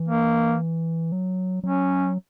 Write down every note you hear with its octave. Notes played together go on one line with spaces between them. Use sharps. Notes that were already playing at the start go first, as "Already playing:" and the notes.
Already playing: E3
A#3
F#3
F#3 C#4